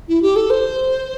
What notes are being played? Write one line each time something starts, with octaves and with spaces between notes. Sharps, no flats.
E4
G4
A4
C5